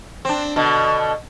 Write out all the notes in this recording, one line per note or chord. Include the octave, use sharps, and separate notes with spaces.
C4 D4
B2 D3